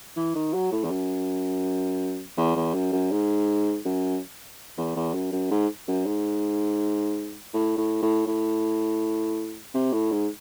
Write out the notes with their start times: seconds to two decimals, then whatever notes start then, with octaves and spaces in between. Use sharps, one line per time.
0.16 E3
0.35 D#3
0.53 F#3
0.72 A2
0.84 E2
0.91 F#2
2.37 E2
2.55 E2
2.74 F#2
2.93 F#2
3.12 G#2
3.85 F#2
4.78 E2
4.96 E2
5.14 F#2
5.32 F#2
5.51 G#2
5.88 F#2
6.06 G#2
7.54 A2
7.78 A2
8.02 A2
8.27 A2
9.74 C3
9.93 A2
10.11 G#2